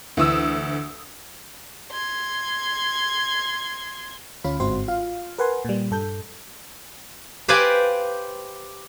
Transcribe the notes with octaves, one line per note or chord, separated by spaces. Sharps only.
D2 E3 D#6 E6
C6 G#6
D2 C#4 F4 F5 B5
G1 G#2 C4 F#4 C5 C6
F4 F5
A#4 B4 F#5 G#5 C6
A#2 G3
G2 A4 G6
G4 B4 C5 D5 F5 G#5